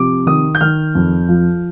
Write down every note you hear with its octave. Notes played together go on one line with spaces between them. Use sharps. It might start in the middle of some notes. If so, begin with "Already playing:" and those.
Already playing: C3 F3 D6
D#3 D#6
G6
D#3 F6
F2
F3